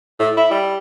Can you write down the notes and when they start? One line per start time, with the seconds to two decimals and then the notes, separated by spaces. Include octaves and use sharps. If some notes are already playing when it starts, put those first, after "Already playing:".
0.19 A2
0.37 E4
0.51 G3